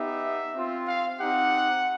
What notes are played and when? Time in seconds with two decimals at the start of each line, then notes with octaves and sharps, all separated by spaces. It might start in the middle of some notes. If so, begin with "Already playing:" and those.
Already playing: B3 D#4 G4 E5
0.56 C4 F4
0.88 F5
1.19 C4 D#4 G4 F#5